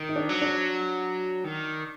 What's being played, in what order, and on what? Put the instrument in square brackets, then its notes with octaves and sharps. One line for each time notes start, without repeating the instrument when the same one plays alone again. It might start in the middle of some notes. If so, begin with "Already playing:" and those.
Already playing: [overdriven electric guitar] D#3
[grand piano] D#4
D4
[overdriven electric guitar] F#3
[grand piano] D4
[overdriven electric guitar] D#3